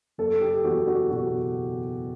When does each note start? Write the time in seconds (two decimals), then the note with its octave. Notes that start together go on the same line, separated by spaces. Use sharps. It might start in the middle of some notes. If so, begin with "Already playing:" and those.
0.18 F#1 A4
0.41 G4
0.64 E2 F#4
0.87 F#4
1.10 B2 F#4